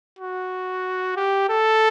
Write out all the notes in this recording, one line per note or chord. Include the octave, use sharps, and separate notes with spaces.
F#4
G4
A4